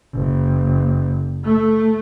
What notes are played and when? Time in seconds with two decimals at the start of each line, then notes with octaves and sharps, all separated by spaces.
0.14 F#1
1.44 A3